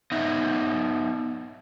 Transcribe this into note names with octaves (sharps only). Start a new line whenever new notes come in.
B3 D#4 D#5 E5